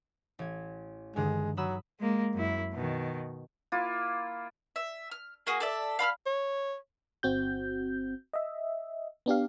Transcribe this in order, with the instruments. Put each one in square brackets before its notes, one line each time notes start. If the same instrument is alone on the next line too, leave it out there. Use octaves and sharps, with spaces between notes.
[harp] A1 G#6
[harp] G2 D3 D#3 [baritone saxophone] G#3
[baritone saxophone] F#3 [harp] B5 D#6 E6
[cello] G#3 A#3
F#2 E4
B2 D#3
[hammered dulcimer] A#3 E4 F4
[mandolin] E5
F6
A#3 F#4 G#4
A4 D5 E5
F5 B5 E6 F6
[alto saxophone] C#5
[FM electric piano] G1 C4 F#4 G6
D#5 E5
B3 D4 G4 F5